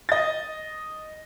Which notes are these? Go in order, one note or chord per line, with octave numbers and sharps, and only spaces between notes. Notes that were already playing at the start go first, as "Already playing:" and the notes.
D#5 A6